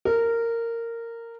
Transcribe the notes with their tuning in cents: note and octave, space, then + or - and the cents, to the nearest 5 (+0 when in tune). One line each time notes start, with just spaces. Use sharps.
A#4 -15